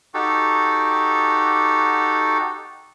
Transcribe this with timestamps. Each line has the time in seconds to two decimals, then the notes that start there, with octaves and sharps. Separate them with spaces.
0.14 D#4 F#4 G4 A4